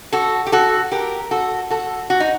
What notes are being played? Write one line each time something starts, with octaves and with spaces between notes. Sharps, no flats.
F#4 A4
G4
F#4 A4
G4 A#4
F#4 A4
F#4 A4
F#4
D#4